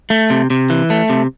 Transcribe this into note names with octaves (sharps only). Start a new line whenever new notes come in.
A3
C3
C3
E3
A3
C3